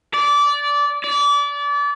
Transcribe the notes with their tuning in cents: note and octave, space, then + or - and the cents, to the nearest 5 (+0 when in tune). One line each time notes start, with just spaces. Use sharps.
D5 -20
D5 -30